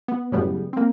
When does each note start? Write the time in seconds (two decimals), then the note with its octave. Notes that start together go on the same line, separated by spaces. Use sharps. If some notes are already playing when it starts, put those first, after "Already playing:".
0.08 B3
0.32 F#2 A2 C#3 G3 B3
0.73 A#3 C4